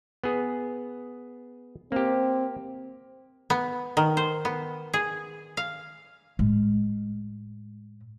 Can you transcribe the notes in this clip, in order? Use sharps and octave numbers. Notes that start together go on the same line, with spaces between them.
B3 G#4
A#3 C4 G4
B3
D#3
C5
B3
G#4
F5
A2 G#3